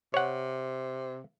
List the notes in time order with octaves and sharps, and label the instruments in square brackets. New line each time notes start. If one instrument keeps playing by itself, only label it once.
[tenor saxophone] C3 [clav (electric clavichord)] C#5 F#5